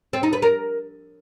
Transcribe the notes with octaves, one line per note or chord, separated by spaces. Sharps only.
C4
D#4
B4
A#4